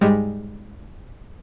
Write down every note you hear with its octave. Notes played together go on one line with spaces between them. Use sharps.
G#2 G3 G#3